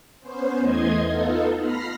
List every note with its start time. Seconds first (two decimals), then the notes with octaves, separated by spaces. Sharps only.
0.21 B3 C#4 C5
0.59 E2 E3 A3 D#5 C6 G#6
1.05 B3 D#4 F4 A4
1.59 B5 F6 A#6 C7